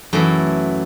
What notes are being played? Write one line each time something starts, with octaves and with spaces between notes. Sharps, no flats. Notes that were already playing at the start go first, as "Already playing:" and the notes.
F#2 E3 A3